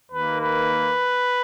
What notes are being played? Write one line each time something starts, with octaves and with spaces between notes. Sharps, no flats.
D#2 D#3 A#3 B4
B4